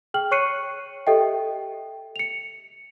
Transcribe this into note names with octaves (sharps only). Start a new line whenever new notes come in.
G#4 G5 F6 F#7
C#5 C#6 F#6 C7 C#7 D#7
G4 A4 D#5 E5 G5
C#7 F7